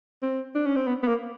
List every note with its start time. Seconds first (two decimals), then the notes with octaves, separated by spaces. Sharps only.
0.23 C4
0.55 D4
0.66 C#4
0.76 C4
0.87 B3
1.03 B3
1.08 A#3